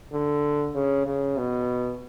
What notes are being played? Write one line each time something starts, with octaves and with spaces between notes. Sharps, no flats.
D3
C#3
C#3
B2